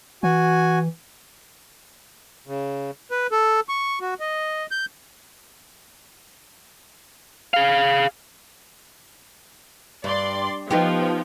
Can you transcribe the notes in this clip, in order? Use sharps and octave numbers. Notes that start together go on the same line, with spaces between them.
E3 F#4 G#5
C#3
B4
A4
C#6
F#4
D#5
G6
G#4 F5
G2 D5 C6
F3 B3 D#4 G4